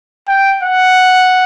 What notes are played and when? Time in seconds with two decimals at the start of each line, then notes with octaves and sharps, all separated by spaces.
0.28 G5
0.63 F#5